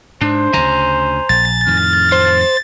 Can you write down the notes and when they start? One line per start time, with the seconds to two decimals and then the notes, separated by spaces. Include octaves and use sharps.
0.21 G#2 D4 C5
0.54 D2 C#3 G#5 A#5
1.29 A#1 A6
1.67 F2 A2 D#3 F6
2.12 C5